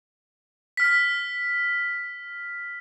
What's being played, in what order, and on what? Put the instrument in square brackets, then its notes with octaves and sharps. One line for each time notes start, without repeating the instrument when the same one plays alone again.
[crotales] F6 B6